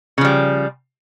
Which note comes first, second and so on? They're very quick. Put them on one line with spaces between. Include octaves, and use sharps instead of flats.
C#3 F3 G3